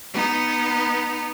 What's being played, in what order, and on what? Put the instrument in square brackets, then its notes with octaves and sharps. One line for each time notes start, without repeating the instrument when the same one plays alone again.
[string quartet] B3 D#4